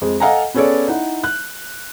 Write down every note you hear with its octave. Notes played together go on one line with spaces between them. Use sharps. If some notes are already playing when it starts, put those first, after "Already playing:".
F2 G#3
A4 D#5 F5 F#5 G#5 A#5
B3 C#4 G#4 A4 C#5 D5
D#4 E4 F#5
F#6